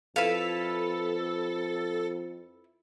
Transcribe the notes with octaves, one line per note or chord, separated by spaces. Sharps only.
F2 E4 A4 B4 F5